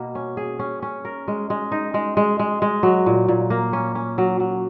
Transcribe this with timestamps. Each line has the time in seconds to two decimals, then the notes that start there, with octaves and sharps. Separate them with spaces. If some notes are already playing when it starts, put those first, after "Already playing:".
Already playing: B2 A#3
0.15 C#4
0.37 G#4
0.59 C#4
0.82 C#4
1.05 A#4
1.28 G#3
1.50 G#3
1.72 D#4
1.94 G#3
2.17 G#3
2.39 G#3
2.62 G#3
2.83 F#3
3.06 A#2
3.28 A#2
3.50 A#3
3.73 C#4
3.95 C#4
4.18 F#3
4.40 F#3